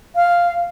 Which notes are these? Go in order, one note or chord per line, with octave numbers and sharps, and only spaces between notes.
F5